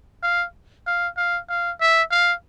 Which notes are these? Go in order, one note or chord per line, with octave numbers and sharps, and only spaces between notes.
F5
F5
F5
F5
E5
F5